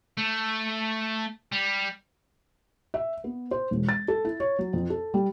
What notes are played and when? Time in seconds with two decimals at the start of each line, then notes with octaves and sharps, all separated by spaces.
0.17 A3
1.52 G3
2.94 E5
3.24 B3
3.51 C5
3.71 E1
3.89 A6
4.08 A4
4.25 E4
4.40 C#5
4.59 F#3
4.73 F2
4.90 A4
5.14 G3